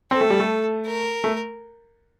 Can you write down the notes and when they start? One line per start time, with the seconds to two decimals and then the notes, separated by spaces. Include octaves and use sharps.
0.11 C4 A4
0.21 A3
0.30 G3
0.40 A3
0.86 A#4
1.24 A3